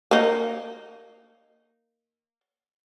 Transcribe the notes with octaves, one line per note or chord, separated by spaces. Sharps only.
A#3 D#4